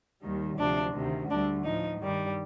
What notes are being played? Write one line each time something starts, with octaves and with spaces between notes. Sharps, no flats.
D#2 D#3 G3
D2 C3 F3 D4
D2 C3 D#3
D2 D3 G3 D4
A2 F3 D#4
G2 D#3 G3